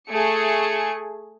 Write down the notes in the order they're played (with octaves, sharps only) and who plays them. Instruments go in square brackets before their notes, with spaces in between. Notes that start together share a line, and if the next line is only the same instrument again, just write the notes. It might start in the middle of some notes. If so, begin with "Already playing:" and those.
[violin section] A3 G#4 C#7